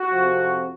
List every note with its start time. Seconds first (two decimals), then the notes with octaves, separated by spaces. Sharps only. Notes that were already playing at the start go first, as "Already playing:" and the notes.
Already playing: F#4
0.11 F2 C3 F3